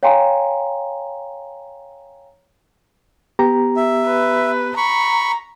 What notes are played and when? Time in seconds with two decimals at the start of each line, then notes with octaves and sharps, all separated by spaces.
0.03 C#5 F5 G5 G#5 A#5 C6
3.39 B3 G4 A#5
3.76 E5
4.07 B4
4.77 A#5 B5 C#6